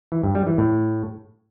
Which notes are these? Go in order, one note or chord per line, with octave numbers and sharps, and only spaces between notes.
E3
G2
G3
E3
A2